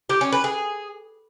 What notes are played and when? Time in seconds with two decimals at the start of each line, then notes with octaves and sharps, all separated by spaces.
0.09 G4
0.21 C#4
0.32 B4
0.44 G#4